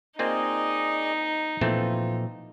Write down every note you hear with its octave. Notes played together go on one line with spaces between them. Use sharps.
A#3 C4 D#4 F4 G#4 D5 D#5
A#2 E3 F3 A3 C4 F4